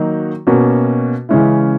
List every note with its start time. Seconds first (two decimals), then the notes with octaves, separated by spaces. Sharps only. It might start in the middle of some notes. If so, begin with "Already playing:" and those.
Already playing: D#3 F#3 A#3 D#4 F#4
0.47 B2 A#3 C#4 F#4
1.29 C#3 E3 G#3 C#4 E4